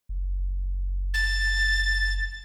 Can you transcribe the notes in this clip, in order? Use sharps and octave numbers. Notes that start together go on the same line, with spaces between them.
F#1
A6